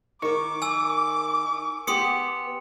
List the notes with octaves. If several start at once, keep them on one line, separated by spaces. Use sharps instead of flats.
D#3 A#4 C#6 D6
G#5 E6
B3 G4 C6 D#6 C#7